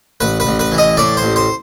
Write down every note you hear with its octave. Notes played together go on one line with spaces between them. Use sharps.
A1 B4
B4
A1
B4
E3
D#5
A2 D5
C5
A1
C5